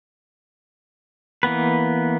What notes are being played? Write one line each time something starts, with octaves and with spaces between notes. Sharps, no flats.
E3 A#3 B3 B4